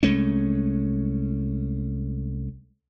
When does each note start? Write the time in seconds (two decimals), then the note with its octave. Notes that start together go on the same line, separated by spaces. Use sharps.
0.03 C2 G#3 A3 C#4